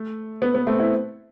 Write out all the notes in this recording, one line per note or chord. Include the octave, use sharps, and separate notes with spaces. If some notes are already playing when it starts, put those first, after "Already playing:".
Already playing: A3
B3
B3
A3 C4
C4 E4